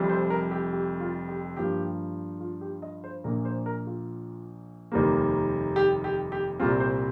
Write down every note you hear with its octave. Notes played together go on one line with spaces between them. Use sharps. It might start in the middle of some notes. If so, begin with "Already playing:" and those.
Already playing: F1 F2 C3 G3
C5
A#4
G4
G4
F4
G4
G2 F3 A#3 G4
F4
G4
D#5
C5
A#1 A#2 A#3 A#4
C5
A#4
F4
F1 D#2 D#3 G3 A#3
G4
G4
G4
C2 A#2 G3 C4 F4
C5